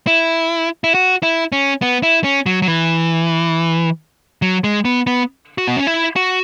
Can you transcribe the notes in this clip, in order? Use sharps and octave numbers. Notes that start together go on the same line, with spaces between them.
E4
E4
F#4
E4
C#4
B3
E4
C#4
F#3
F#3
E3
F#3
G#3
B3
B3
F#4
B3
C#4
E4
F#4